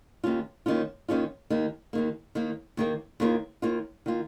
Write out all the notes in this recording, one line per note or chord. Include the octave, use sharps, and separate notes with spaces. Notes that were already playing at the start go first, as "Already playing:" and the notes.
D#2 D#3 C#4 F4
D#2 D#3 C#4 F4
D#2 D#3 C#4 F4
D#2 D#3 A#3
D#2 D#3 A#3
D#2 D#3 A#3
D#2 D#3 A#3
D#2 D#3 A#3 F4
D#2 D#3 A#3 F4
D#3 A#3 F4